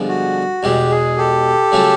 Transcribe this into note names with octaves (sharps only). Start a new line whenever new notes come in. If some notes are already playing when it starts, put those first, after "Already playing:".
Already playing: G2 D3 F3 G#3 B3
F#4
E2 B2 G#3 G4
G#4
G4 A4
C#3 F#3 A3 C#4